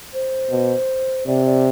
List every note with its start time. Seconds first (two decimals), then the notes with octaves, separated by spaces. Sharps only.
0.14 C5
0.51 B2
1.27 C3 D5
1.46 D5